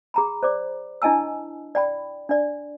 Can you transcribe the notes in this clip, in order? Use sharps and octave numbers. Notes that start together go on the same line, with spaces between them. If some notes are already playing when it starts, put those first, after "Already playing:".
G#4 A#5 B5
C5 D5 D6
D4 E4 D#5 G#5 A5 E6
D5 G5 B5
D4 D5